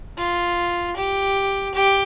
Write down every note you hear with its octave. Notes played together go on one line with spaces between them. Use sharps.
F4
G4
G4